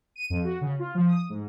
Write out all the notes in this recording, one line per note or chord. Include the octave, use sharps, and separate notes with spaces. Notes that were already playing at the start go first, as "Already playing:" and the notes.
D#7
F2
F#4
C#3
F4
F3
D#6
G#2